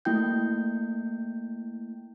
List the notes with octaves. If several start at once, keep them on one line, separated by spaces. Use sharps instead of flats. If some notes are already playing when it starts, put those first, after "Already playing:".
A3 A#3 E4 G5 G6